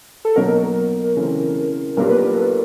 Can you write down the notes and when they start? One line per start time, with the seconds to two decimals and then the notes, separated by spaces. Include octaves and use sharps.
0.25 A4
0.36 B2 F#3 A#3 D#4 F#4 A#4
1.16 C#3 E3 A3 C4
1.97 B1 A#2 G3 B3 D4 A#4
2.09 B4
2.17 A#4
2.37 A4